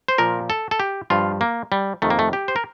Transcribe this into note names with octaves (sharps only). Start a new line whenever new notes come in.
C5
A#2 F3 A#4
A4
A4
G4
G2 F3 F4
A#3
G3
F2 C3 D#3 A3
A#3
A3
G4
C5
A#4